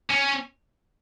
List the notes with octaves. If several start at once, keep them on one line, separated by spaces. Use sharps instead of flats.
C#4